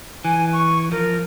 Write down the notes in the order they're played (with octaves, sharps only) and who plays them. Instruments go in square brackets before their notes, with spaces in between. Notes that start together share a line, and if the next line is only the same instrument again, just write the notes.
[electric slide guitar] E3 [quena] G#5
[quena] C#6
[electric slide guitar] F3 [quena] A#4